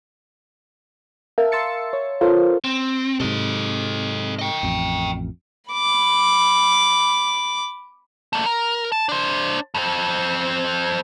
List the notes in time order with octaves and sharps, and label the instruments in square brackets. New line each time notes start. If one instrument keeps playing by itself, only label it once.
[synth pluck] A#4 E5 F5 A5
C6 E6 A6 C#7
C#5
F4 A4 A#4 C5 C#5 F5
[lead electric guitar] C4
[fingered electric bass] G#2 C3 [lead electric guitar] A4 D#5
[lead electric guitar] D#5 G5
[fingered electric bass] A1 F2
[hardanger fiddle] B5 D6
[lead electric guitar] A3 A#3
A#4
A5
D4 C5
F2 C4